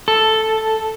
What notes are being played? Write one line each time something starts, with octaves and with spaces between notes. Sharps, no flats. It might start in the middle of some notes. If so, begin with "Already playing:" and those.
A4